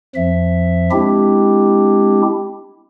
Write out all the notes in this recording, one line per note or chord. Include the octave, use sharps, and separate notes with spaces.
F2 F3 E5
G#3 C4 D4 E4 G4